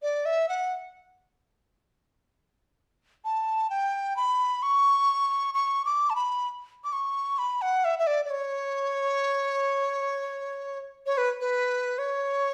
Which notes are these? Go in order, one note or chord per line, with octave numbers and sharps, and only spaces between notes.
D5
E5
F#5
A5
G5
B5
C#6
C#6
D6
A5
B5
D6
C#6
B5
F#5
E5
E5
D5
D5
C#5
C#5
B4
B4
C#5